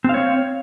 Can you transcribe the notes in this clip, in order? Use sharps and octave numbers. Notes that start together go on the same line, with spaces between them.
C4 C#5 F5